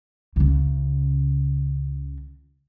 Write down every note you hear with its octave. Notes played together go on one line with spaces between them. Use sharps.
C#2 C#3